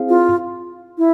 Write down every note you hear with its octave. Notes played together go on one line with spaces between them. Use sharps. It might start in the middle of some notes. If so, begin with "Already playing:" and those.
Already playing: C4 E4 G#4 C5 F5
F4
E4